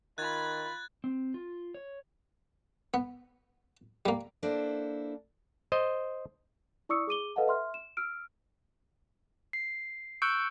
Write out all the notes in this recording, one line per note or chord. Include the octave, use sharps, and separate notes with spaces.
D#3 F4 B5 F#6 G#6 A6
C4
F4
C#5
B3
G3 A#3
A#3 D4 E4 A4 C5
C5 D#5
E4 D5 C#6 D#6 E6 C#7
G#4 D6 D#7 G7
A4 B4 D#5 F5 F#5 A5
E5 C6 F6
E7
E6 F6 D7
C7
C#6 E6 F#6 G6 C#7 D7